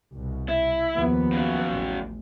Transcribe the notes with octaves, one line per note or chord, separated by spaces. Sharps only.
C2 B2
E4
D#2 F3 B3
C#3 F#3
A1